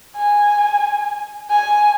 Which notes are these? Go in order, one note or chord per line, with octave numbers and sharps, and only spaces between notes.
G#5
G#5